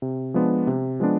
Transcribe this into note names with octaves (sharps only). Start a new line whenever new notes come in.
C3
F3 G#3 B3 D4
C3
F3 G#3 B3 D4